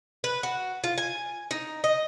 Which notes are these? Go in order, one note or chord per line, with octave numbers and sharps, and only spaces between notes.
B4
F#4
F4
G#5
D#4
D#5